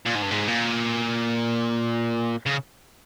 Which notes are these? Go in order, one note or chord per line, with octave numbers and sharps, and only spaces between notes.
A#2
G#2
G2
G#2
A#2
C#3